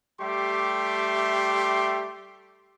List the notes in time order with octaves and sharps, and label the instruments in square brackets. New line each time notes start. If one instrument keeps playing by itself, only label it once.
[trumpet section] G3 A3 G4 E5 C6 D6